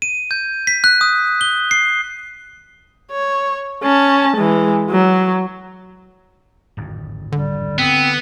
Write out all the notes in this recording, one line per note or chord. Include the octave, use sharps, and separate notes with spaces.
D#7
G6
B6
F#6
D#6
G7
C7
C#5
C#4 A5
E3 G#3
F#3
D1 G#1 F2
D3 G3
B3 C4